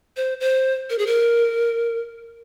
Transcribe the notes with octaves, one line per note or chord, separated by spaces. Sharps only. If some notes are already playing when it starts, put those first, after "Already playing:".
C5
C5
A#4
G#4
A#4